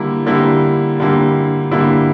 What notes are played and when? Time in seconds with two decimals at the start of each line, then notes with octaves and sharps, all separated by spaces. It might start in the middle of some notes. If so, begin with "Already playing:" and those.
Already playing: D3 G3 A#3 E4
0.26 D3 G3 A#3 E4
1.00 D3 G3 A#3 E4
1.71 D3 G3 A#3 E4